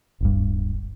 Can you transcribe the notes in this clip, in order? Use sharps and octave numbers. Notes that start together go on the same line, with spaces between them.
D1 G1 G2